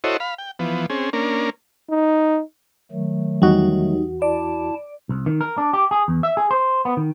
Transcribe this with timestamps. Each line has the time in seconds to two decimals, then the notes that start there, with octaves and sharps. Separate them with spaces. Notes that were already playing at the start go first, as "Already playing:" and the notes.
0.04 E4 F#4 A4 C5 C#5 D#5
0.20 F5 B5
0.38 G5
0.59 E3 F3 B3
0.90 C4 C#4 G#4
1.13 A#3 C#4 D4 A#4
1.90 D#4
2.91 D#3 F#3 A3
3.42 E2 G3 D#4 F#4
4.22 E4 D5 A5
5.09 C2
5.26 D#3
5.41 A#4
5.58 D4
5.73 G4
5.91 G#4
6.08 E2
6.23 E5
6.37 G#4
6.51 C5
6.85 B3
6.97 D#3